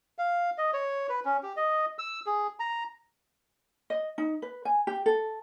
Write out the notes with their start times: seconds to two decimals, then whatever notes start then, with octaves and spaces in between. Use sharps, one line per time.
0.18 F5
0.58 D#5
0.73 C#5
1.09 B4
1.25 C#4
1.43 G4
1.56 D#5
1.99 E6
2.26 G#4
2.60 A#5
3.90 D#5
4.18 D#4
4.42 B4
4.65 G#5
4.87 G4
5.06 A4